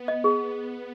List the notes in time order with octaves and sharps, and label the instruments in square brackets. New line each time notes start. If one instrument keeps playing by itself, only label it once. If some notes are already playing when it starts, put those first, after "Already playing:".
Already playing: [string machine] B3
[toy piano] D#5
G#4